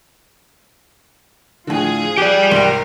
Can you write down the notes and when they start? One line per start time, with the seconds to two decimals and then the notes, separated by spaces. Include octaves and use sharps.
1.67 A2 D3 F3 G#4
2.18 G4 D5 F#6 D7
2.51 C2 G#2 A#4